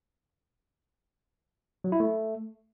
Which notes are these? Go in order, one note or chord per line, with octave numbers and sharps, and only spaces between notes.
F#3
E4
A3